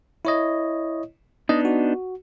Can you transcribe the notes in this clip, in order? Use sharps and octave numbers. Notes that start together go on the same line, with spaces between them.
E4 C#5 D#5
B3 D4 D#4 D#5
F#4